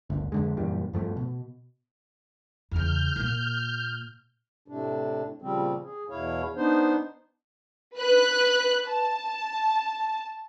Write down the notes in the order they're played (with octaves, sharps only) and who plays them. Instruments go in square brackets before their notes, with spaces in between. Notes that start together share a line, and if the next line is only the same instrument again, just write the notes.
[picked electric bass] G1 D2
F2 D3 G#3
F#2 A#2 E3 G3
G2 F3 A3
B2
[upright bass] E2 C#3 [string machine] F6 G6
[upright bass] A#2 A#3
[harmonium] A2 C3 D4
A#2 C#3 F3 G3 C4
G#4
E2 B2 E4 C#5 F5
B3 D4 D#4 C5
[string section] B4 F#6
A5